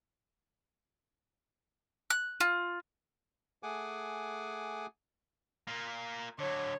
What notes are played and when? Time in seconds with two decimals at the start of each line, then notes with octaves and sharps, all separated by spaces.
2.10 F#6
2.41 F4
3.63 A3 G#4 F#5 G#5 D6
5.67 A#3 F4
6.39 D3 F#3 C#5